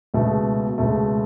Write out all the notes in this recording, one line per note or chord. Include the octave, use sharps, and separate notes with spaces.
C#2 B2 A3
C#2 B2 A3